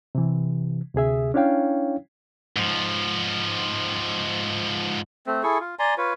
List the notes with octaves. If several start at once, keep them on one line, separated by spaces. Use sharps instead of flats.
C3 E3
D2 C3 G#4 E5
C#4 D4 E4 C#5 F5 G5
G#2 F3
A3 C4
E4 G#4 A4 C#6
F4
D5 G#5 A#5 C6
F4 B4 C#5